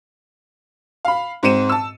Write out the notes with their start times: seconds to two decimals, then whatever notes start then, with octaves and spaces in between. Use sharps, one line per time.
1.05 F5 B5
1.43 G#2 C4 C5 C#7 D#7 E7
1.69 A5 E6